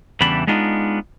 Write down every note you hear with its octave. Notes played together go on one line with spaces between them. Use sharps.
E2 C#3 E3 G3 D4 B5
G#3 B3 D4 D#4 F4